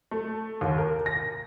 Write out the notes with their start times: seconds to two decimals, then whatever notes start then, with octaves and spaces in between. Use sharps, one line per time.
0.11 A3
0.61 D#2
0.78 A#4
1.06 A#6